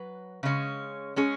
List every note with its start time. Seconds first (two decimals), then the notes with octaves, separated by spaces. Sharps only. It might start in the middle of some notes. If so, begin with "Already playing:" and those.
Already playing: F#3 B4
0.43 C#3 G#3 C#4
1.16 G#3 C#4 G#4